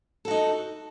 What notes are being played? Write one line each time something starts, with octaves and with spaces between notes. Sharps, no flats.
D#4 F#4 A4